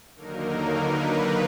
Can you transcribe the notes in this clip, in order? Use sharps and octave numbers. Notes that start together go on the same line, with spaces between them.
D#2 D3 F#3 A#3 D#4 A#4
B4